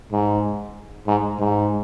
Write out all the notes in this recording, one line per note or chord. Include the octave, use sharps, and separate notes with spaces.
G#2
G#2
G#2